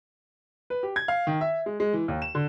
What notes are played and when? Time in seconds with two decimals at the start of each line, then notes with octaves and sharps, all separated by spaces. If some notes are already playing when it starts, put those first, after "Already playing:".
0.70 B4
0.83 G4
0.96 G#6
1.08 F5
1.27 D#3
1.41 E5
1.66 G#3
1.80 G#3
1.93 E3
2.08 D#2
2.22 E7
2.35 D3